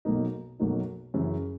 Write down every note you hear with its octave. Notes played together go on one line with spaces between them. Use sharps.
B1 B2 F#3 A#3 D#4
B1 B2 F#3 A#3 D#4
F#2 C#3 E3